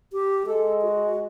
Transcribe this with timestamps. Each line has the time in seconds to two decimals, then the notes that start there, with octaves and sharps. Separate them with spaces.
0.13 G4
0.46 G#3 A4
0.82 F#4